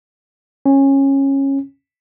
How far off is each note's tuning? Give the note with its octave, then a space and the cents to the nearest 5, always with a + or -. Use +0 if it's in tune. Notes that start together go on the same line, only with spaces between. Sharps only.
C#4 -20